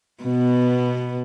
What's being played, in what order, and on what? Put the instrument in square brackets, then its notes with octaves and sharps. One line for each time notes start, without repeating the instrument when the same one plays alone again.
[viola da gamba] B2 B3